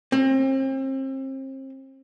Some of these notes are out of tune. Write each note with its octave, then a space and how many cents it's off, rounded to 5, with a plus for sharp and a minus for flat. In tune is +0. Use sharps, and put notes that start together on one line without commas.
C4 +35